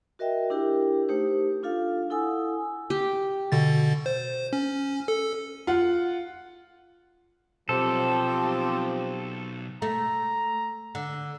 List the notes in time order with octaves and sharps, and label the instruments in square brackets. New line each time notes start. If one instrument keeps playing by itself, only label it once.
[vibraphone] F#4 A#4 D#5 E5 G5
D4 E4 G4 A#4 G5
A3 D#4 G4 C5
D4 F4 A4 F5
E4 A4 F#5 G#5 D#6 E6
[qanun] G4
[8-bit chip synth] B2 D3 A6
C5
C#4
A4
[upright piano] F4 F#5
[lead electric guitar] B1 [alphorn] F3 [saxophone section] C4 G4 [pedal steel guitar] A4
[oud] A3 [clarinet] A#5
[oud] D3